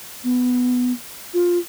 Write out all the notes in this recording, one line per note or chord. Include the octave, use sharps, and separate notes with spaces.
B3
F4